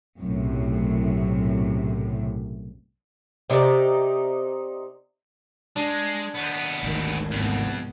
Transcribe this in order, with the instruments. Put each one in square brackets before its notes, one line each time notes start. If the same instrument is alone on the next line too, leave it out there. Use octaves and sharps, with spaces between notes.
[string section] B1 F#2 A2 C3
[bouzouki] C3 D#4 B4 D5
[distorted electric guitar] G#3 [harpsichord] D4
[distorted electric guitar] D#2 B3
[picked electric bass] G#1 D2 D#3
[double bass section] C2 G#2 B3 [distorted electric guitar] F2